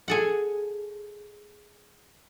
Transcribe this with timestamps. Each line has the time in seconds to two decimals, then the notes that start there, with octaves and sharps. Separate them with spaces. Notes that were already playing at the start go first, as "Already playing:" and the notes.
0.08 G#4 A4 F#5